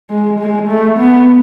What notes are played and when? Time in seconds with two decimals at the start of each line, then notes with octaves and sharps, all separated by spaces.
0.10 G#3
0.39 G#3
0.68 A3
0.98 B3